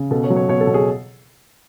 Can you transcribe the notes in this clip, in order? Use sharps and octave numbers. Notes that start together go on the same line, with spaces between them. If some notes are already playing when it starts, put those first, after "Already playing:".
Already playing: C#3
B2 A4
C#5
F#3
C#5
B2 C#5
A4
B2
G#4